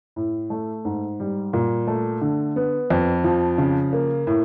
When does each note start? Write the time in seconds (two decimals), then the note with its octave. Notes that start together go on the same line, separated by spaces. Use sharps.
0.16 A2
0.50 A3
0.85 G#2
1.20 G3
1.53 A#2
1.87 A3
2.21 D3
2.56 B3
2.90 F2
3.24 F3
3.58 C#3
3.93 A#3
4.27 A2